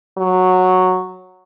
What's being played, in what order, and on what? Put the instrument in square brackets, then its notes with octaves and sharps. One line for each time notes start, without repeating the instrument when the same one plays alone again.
[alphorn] F#3